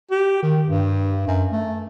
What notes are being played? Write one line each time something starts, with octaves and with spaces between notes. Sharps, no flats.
G4
D#3
G2
F#2
A3